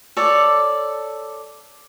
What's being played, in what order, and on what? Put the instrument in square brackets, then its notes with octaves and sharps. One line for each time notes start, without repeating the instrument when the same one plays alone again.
[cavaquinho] A4 C#5 D5